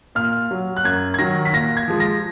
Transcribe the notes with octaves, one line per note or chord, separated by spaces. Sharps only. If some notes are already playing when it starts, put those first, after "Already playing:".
A#2 F6
F#3
F#6
F#2 G#6
G#6
D#3 F#3 A#6
B6
A#2 A#6
G#6
F3 G#3
A#6